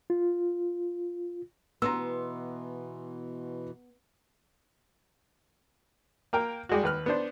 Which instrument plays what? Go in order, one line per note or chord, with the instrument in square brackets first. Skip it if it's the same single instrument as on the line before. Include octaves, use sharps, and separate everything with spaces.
[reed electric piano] F4
[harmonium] B2 E3 [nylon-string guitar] B3 [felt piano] A#5 C6 E6
[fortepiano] A#3 A#4 G5
G3 G#3 F#4
D#2 B4 F6
B3 D4 C5